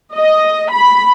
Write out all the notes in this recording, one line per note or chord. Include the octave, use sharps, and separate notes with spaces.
D#5
B5